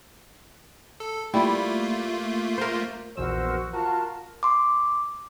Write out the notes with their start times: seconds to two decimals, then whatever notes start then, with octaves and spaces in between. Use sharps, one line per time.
1.00 A4
1.34 G3 A3 A#3 E4 F4
2.58 A#4 C5
3.17 A#1 E2 F#4 A#4 C5 E6
3.73 F4 F#4 A#4 A5
4.43 C6 D6